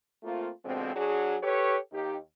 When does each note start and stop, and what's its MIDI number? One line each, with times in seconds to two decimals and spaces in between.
0.23 0.49 57
0.23 0.49 58
0.23 0.49 60
0.23 0.49 65
0.65 0.96 47
0.65 0.96 50
0.65 0.96 53
0.65 0.96 56
0.65 0.96 60
0.96 1.36 54
0.96 1.36 62
0.96 1.36 66
0.96 1.36 68
1.43 1.76 67
1.43 1.76 69
1.43 1.76 71
1.43 1.76 73
1.92 2.17 39
1.92 2.17 63
1.92 2.17 67